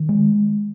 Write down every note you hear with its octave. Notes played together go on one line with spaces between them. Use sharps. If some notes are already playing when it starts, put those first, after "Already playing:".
Already playing: D#3
G#3